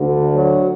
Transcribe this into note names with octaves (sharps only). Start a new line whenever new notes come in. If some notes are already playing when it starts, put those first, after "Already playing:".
Already playing: D2 D3
F#3